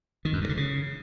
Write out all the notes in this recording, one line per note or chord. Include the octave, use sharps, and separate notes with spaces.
D#3
F#2
G2
D3
C#3